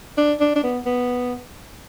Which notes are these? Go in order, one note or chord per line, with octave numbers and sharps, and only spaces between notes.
D4
D4
D4
B3
B3